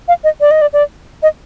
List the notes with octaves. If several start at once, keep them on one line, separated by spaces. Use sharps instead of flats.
F5
D#5
D5
D#5
D5
D5
D#5